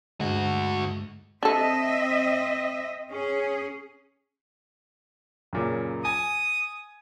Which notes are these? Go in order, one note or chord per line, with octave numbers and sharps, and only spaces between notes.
D2 G2 G#3 F#4
C4 D4 A4 D#5 E5
C#4 G#4
F#2 A#2 C#3
G#5 D#6